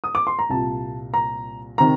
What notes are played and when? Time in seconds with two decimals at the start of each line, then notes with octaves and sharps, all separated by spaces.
0.04 D#6
0.15 D6
0.27 C6
0.39 A#5
0.50 C2 A#2 A5
1.14 A#5
1.78 C3 D#3 A#5